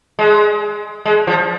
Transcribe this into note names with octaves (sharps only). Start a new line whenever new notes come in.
G#3
G#3
F3